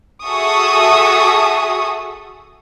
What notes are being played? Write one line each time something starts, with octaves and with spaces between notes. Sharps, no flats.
F#4 G#4 A4 E5 C#6 D#6